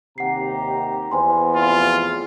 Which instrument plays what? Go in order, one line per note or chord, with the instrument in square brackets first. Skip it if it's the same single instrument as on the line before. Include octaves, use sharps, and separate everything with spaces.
[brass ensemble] D#2 G4 A#5 [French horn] C3 [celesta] F#5 C7
[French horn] E2 [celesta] C5 G#5 C6
[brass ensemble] F2 A2 C3 [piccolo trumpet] F4